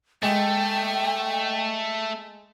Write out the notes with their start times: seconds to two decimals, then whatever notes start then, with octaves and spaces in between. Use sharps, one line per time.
0.23 G#3 A3 G5